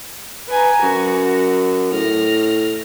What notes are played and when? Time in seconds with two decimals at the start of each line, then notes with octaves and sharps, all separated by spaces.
0.49 B4 G#5 A#5
0.83 F#2 F#4
1.92 A2 F6 A#6